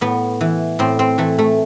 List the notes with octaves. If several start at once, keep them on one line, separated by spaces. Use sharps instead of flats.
A2 B3
E3
A2 C4
C4
E3 A3
A3